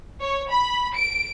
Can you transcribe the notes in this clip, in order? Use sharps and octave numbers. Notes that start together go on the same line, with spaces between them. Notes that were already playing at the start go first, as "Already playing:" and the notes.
C#5
B5
D7